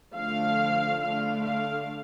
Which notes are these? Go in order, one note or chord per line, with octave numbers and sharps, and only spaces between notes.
D3 F3 A3 D4 F5
D3 A3 D4 F5
F5